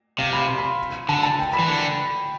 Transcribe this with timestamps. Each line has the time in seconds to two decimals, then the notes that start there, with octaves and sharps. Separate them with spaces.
0.18 C3 F5
0.33 B5
0.46 C6
0.58 B5
1.09 D3 A5
1.23 A5
1.39 G5
1.53 B5
1.59 E3
1.68 D3